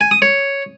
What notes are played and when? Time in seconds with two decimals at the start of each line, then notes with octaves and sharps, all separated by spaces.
0.01 G#5
0.11 D#6
0.22 C#5